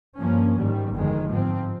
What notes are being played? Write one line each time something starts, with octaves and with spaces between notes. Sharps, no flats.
G2 F3 A#3 C#4
G#2 D#3 G3
G1 F2 D#3 G#3
G#2 F3 C4